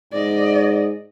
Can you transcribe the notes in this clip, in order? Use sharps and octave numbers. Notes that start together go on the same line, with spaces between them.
G#2 D5 D#5